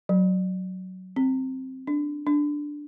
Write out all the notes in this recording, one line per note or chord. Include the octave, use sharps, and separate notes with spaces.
F#3
C4
D4
D4